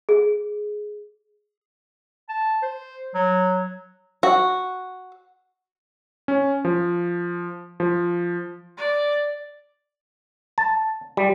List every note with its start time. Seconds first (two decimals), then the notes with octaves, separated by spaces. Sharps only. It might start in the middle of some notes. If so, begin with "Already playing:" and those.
0.09 G#4
2.29 A5
2.63 C5
3.15 F#3
4.23 F#4
6.28 C#4
6.65 F3
7.80 F3
8.77 D5
10.58 A5
11.17 G3